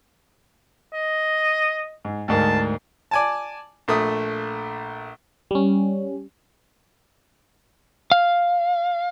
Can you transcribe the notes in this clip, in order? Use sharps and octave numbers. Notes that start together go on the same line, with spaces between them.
D#5
G#2
D2 G#2 A#4 A5
D5 G#5 A5
A#1 A3 D#6
G3 C#4
F5